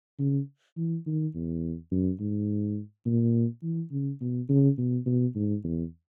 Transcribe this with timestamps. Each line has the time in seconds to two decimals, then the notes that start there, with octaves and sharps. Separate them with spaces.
0.20 C#3
0.77 E3
1.06 D#3
1.35 E2
1.92 F#2
2.20 G#2
3.06 A#2
3.63 E3
3.92 C#3
4.21 B2
4.49 C#3
4.78 B2
5.06 B2
5.35 G#2
5.64 E2